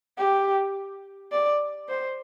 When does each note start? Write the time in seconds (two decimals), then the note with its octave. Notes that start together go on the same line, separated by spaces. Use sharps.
0.18 G4
1.32 D5
1.88 C5